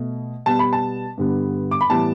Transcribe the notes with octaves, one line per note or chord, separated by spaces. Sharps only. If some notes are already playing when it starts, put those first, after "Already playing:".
Already playing: B2 A3
B2 G3 B3 A5
B5
A5
G2 D3 G3 B3
D6
B5
A2 E3 G3 B3 A5